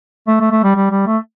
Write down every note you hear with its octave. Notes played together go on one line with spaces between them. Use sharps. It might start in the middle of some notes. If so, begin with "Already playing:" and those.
A3
A3
A3
G3
G3
G3
A3